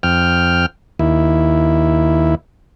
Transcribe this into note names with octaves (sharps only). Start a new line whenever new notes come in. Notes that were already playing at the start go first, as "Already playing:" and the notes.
F2 G5 F6
D#2 E4